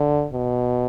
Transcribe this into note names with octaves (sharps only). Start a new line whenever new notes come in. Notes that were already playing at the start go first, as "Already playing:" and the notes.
Already playing: D3
B2